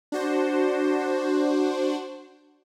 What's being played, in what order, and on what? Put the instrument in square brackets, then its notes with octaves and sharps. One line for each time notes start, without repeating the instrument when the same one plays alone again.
[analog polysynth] D4 F#4 C5